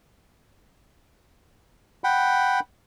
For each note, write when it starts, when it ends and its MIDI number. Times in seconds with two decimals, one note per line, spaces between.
2.04 2.60 78
2.04 2.60 79
2.04 2.60 83